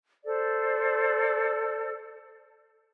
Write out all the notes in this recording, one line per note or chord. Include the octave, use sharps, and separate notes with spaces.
A4 C5 D5